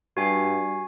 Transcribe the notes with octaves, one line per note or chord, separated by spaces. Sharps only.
G2 F#4 G#5 C7